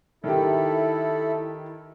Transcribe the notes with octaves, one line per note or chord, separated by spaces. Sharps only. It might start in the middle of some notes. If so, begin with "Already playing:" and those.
D#3 E4 G4 A4